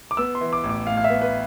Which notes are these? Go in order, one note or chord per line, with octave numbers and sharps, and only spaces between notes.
D6
B3 E6
C6
E3
D6
A1
D6
A2 F5
F5
E5
B3
B4